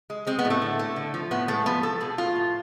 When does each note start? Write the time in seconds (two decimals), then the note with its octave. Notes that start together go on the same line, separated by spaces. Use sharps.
0.10 G#3
0.27 G#3 C4
0.39 B3
0.45 A2
0.50 A3
0.62 D3
0.79 A3
0.96 D3
1.14 F3
1.31 A2 B3
1.48 G#3 A3
1.66 F3 B3
1.83 F3 A4
2.00 B2 G#4
2.18 A3 F4
2.36 A2